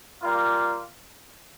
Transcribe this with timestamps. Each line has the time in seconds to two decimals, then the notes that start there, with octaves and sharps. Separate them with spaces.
0.22 G3 A#3 F4